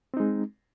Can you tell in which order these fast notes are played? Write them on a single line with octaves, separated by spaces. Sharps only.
C4 D#4 G#3